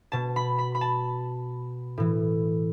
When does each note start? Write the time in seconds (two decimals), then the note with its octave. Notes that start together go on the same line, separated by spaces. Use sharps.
0.12 B2 A5
0.36 B5
0.59 B5
0.75 B5
0.81 A5
1.98 A2 E3